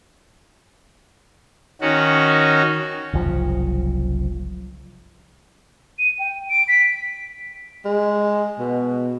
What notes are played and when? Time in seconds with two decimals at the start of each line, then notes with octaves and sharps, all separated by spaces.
1.81 D#3 C#4 F#4
3.14 F#1 C2 F#2 F3
5.99 D#7
6.19 G5
6.50 D7
6.68 B6
7.85 G#3
8.59 B2